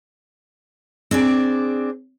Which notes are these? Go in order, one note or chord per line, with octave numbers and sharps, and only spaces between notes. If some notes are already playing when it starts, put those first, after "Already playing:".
C4 D4 G#4 D5